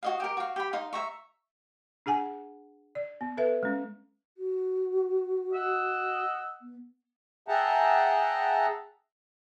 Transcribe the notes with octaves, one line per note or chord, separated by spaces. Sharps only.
F#4 D#5 F5
G4 A#4
F#4 F5
G4 B5
D#4 F5 C6
E5 A#5 C#6
D4 G#4 F#5 G#5
D5
B3
A4 B4 E5
G#3 C#4
F#4
D#5 F#5 E6
B3
G#4 E5 F#5 G5 A5 A#5